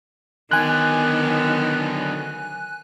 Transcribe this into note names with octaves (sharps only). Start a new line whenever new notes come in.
D3 D#3 F#3 B3 G#5 F#6